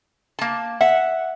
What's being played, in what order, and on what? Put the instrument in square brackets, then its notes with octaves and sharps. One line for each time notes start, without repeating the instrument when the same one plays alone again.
[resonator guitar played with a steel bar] A#3 A5
[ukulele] E5 [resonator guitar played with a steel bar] F#5